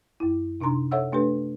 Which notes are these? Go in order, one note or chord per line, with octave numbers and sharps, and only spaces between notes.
F#2 E4
C3 D4 D#4 A#5 C6
A4 C5 C#5 E5 F#5 E6
A3 D4 G4 A4 B4